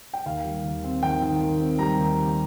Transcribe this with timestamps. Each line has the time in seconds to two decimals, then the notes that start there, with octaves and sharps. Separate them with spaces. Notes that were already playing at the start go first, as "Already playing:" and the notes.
0.13 G5
0.26 D#2 F5
0.44 G3
0.65 D#2
0.84 C4
1.03 D#3 G5
1.21 D#3
1.41 D#3
1.60 C4
1.79 G3 A#5
1.99 D#2
2.18 G3